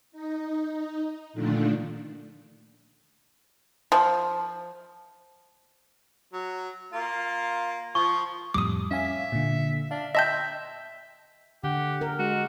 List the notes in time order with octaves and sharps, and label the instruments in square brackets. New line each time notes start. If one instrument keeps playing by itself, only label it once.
[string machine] D#4
A#2 D3 D#3 F3 A3 D4
[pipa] F3
[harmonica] F#3
A#3 F4
[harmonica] F3 [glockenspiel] C#6
[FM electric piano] F2 A2 G3 [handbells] D6 D#6
[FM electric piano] C#4 F5 G#5 [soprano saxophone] E5
[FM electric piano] A#2 D3
[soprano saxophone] D4 [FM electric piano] F5
[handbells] D#5 A5 G6 [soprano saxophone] E5 [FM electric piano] G5 C6 E6
[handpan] D3 [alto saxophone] G4 [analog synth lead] F#5
[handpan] A#4
[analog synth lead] G#3 [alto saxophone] F#4